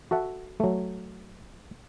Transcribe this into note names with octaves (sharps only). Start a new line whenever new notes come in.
F#4 A4 E5 F#5
F#3 A3